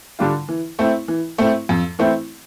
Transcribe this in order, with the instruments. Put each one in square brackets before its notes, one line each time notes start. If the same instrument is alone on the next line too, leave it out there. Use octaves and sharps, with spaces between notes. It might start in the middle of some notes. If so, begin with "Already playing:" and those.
[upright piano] D3 G3 D4 F4
E3
A3 C4 E4
E3
A3 C4 E4
F2
E3 A3 C4 E4